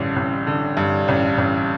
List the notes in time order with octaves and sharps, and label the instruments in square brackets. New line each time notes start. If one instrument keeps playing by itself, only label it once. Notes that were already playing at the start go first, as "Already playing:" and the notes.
Already playing: [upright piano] A1 G2 D3
A1
D3
G2
A1
A1